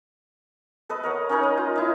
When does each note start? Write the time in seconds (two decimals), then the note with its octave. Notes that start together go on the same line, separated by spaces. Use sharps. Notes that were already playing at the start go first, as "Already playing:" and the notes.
0.89 A4 B4 D#5
1.03 A#4 C#5 F#5
1.29 C#4 D#4 A#4 C#5
1.43 D#6
1.58 F4
1.76 D#4 E4